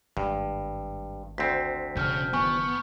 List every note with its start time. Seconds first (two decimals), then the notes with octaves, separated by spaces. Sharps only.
0.17 G#1 G2
1.38 D2 C4 B6
1.97 E1 E2 C#3 A5 F6 G6
2.33 F#1 D#3 E3 B3 G#5 C#6